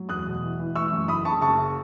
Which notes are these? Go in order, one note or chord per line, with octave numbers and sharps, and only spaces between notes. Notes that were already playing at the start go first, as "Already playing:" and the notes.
Already playing: F#3
E2 D#6 F#6
B2
E3
E3
E3 C#6 E6
F#2
F#1 B5 D#6
F#1 A5 C#6
F#1 A5 C#6